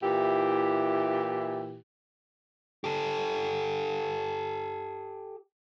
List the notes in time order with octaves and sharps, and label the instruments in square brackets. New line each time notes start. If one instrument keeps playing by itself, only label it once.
[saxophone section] A#2 E3 E4 G4
[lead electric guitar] G4 A4